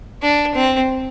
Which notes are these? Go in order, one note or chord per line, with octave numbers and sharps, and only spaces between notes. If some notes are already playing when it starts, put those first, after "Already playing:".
D4
C4